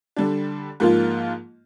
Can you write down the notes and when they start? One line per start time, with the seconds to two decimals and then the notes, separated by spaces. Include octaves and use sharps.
0.16 D3 G3 D4
0.80 G#2 F3 A#3 F4